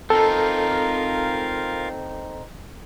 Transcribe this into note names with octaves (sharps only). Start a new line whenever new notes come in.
C4 D#4 F4 A4 A#4 F5